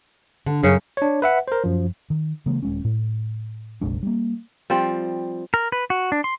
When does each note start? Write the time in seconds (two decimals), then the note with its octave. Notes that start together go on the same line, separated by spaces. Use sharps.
0.46 D3
0.63 F#2 C#3
0.97 D4 C#5
1.22 B4 E5 F#5
1.48 A#4 C5
1.64 F#2 F3
2.10 D#3
2.46 C#3 E3 G#3 A#3
2.62 D#1 G#3 C#4
2.85 A2
3.81 F#1 B1 G#3 D4
4.03 G3 A#3
4.70 F3 G3 C4
5.54 A#4
5.72 B4
5.90 F#4
6.12 D4
6.24 C6